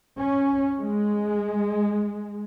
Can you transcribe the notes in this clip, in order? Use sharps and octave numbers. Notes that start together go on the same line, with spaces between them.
C#4
G#3